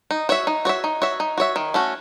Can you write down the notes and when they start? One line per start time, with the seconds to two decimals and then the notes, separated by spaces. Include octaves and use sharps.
0.11 D#4
0.29 F#4 C#5 E5
0.47 D#4
0.65 F#4 C#5 E5
0.84 D#4
1.02 F#4 C#5 E5
1.20 D#4
1.38 F#4 C#5 E5
1.56 D#3
1.74 A3 C#4 F#4